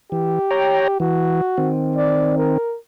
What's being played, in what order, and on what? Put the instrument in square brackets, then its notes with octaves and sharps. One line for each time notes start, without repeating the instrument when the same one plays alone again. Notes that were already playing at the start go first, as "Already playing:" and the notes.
[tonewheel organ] E3 [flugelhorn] G4
[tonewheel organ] C#5 G5 A#5
[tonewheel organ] E3 [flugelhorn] F#4
[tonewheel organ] D#3 C4
[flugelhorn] D5
A#4